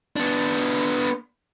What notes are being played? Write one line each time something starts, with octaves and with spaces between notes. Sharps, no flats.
B3 D4